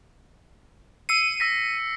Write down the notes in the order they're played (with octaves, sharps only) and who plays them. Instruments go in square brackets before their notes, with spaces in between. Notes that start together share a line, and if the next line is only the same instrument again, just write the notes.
[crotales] E6 C7 C#7 [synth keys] D#7
[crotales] E6 A#6 B6